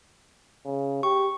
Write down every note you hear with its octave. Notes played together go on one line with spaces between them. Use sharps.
C#3
G4 C#6